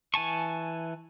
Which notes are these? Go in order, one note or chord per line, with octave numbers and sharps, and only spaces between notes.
E3 G#5 A5 C#6